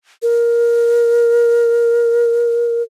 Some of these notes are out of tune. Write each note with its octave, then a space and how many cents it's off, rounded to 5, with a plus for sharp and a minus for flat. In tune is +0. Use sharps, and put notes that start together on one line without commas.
A#4 +15